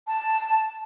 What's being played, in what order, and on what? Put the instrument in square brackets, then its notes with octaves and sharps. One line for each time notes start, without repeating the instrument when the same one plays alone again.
[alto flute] A5